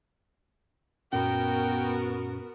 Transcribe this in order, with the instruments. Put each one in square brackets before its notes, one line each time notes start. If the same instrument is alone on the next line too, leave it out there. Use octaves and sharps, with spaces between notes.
[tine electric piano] F#2 A#2 C#4 [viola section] B3 F#4 A#4 [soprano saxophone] G5